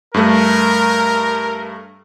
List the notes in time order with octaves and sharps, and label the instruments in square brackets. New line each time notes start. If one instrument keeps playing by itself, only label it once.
[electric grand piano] G2 A3 [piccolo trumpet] A#4